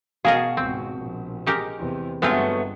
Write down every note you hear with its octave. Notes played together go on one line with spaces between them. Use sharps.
B2 F#4 G#4 A#4 D#5 F5
G#1 C#2 C4
A#1
G#3 G4 A#4
E2 C3
G1 F#3 G#3 A3 B3 C4 F4